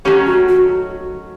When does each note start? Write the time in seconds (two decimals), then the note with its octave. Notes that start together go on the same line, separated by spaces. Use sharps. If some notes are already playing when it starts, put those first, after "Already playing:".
0.05 D#3 F#3 A3 C#4 G4
0.26 F#4
0.49 F#4